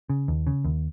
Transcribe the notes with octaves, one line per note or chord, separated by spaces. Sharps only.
C#3
D#2
C#3
D#2